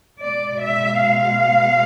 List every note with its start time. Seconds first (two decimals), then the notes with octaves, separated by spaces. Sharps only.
0.22 B2 G#3 D5
0.61 E5
1.00 F5